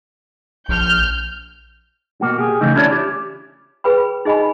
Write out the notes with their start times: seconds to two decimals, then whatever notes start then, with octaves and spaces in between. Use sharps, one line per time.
0.69 A#1 F6 G6
2.21 B2 A#3 F#4
2.38 G4 G#4
2.61 C#3 E3 A3 D#4
2.76 C#4 D4 E4 F4 C#5 D5
2.91 G4
3.84 G#4 B4 G5 B5
4.25 D#4 G#4 D#5 G#5 B5